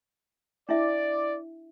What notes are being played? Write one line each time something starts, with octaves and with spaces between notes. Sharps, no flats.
D4 E4 D5 E5